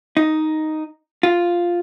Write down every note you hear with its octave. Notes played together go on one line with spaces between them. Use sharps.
D#4
F4